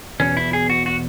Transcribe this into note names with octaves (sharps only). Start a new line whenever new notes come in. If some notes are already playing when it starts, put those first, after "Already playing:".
E2 B2 C#4
E4
G#4
F#4
F#4